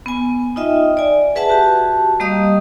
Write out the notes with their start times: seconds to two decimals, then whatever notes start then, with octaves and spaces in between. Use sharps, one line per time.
0.06 B3 G#5
0.56 D#4 F4 D#5 E5 G5
0.97 D5 G#5
1.36 G#4 B4 E5 F#5 A5
1.49 F#4 G4 A5
2.20 G3 A#3 G4 D#5 F5 D#6